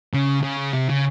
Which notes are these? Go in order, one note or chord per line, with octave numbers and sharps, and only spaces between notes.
C#3
C#3
C3
C#3